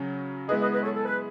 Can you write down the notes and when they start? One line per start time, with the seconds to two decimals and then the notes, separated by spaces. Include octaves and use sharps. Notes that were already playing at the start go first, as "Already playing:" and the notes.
Already playing: C#3 F#3 C#4
0.49 G#3 B3 E4 G#4 B4 D#5
0.61 B4 D#5
0.72 B4 D#5
0.83 A4 C#5
0.95 A4
1.05 B4